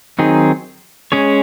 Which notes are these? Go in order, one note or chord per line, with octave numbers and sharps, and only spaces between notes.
D#3 F#3 C4 D#4 G#4
G#3 C#4 G#4 C#5